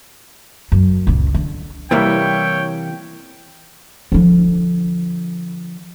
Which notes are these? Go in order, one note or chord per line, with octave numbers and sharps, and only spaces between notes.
F#2
C#2 A#2
D3
C3 E3 G3 A#3 E4 C#5 G5
D3 F3